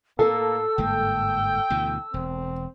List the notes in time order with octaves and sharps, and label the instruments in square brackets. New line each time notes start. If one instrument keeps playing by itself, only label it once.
[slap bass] A2 [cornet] A#3 [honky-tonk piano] A4 [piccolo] E6
[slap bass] G1 G#2 A#3 [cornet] G5
[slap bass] D2 B2 E3
[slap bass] E1 [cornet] C4